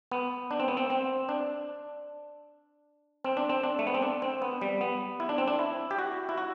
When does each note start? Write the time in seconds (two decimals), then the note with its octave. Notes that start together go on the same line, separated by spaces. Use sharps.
0.11 B3
0.51 D4
0.60 C4
0.68 B3
0.77 C4
0.90 C4
1.29 D4
3.24 C4
3.37 D4
3.49 C4
3.63 D4
3.79 A3
3.87 B3
3.94 C4
4.02 D4
4.22 C4
4.42 B3
4.61 G3
4.81 B3
5.20 E4
5.29 D4
5.38 C4
5.48 D4
5.59 E4
5.91 G4
5.99 F#4
6.29 E4
6.38 F#4